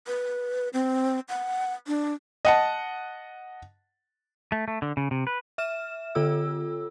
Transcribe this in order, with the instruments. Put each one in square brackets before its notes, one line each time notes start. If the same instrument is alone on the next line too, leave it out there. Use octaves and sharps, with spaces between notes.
[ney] B4
C4
F#5
D4
[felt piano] D#5 F#5 A5
[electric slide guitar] A3
A3
D3
C#3
C3
B4
[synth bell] E5 F6 E7
D3 F4 A4 E6